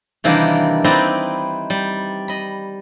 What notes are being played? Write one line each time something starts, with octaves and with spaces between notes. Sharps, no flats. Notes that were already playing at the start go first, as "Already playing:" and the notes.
C3 D#3 E3 G3 A#3 D4
C4 D#4 E4 B4 D5 A#5
G3
D#5 B5